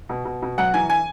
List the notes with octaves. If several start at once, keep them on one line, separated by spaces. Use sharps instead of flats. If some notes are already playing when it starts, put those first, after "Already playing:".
B2
B2
B2
F#2 F#5
E3 G#5
G#5